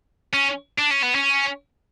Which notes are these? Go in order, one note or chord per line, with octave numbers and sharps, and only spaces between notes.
C#4
D4
C#4
B3
C#4